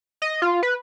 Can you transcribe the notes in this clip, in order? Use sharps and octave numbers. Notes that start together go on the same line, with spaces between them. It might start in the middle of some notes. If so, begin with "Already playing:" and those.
D#5
F4
B4